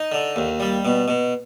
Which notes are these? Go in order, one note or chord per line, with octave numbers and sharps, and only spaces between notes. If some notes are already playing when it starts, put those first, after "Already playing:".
Already playing: D#4
D3
D#2
G3
B2
B2